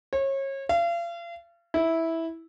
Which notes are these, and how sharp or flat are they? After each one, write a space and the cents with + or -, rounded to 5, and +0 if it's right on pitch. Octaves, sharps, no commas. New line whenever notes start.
C#5 -30
F5 -35
E4 -10